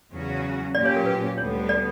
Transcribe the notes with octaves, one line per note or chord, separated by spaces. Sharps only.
E2 C#3 F#3 C#4 F#4
A#2 F#3 C#4 G4 D5
C#5
A#4
B4
D2 D3 G3 B3 C#5
D5